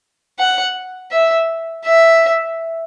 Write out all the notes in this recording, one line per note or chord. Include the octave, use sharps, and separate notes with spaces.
F#5
E5
E5